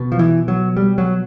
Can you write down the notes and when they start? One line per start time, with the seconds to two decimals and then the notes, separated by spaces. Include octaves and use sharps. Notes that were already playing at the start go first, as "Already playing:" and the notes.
Already playing: B2
0.12 F3
0.19 E3
0.48 F#3
0.77 G3
0.98 F#3